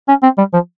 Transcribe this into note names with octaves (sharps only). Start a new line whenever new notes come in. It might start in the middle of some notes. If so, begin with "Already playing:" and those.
C#4
C4
G3
F3